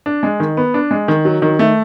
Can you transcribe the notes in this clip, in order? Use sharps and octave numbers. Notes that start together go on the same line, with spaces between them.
D4
G#3
D#3
B3
D4
G#3
D#3
F#3
D#3
A3